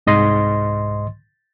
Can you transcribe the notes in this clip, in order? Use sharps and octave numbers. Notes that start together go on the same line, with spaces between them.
C2 G#2 D#5 C6